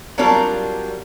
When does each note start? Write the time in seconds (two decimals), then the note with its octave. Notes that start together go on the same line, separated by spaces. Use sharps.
0.18 F#3 G3 C4 D4 F4 A#4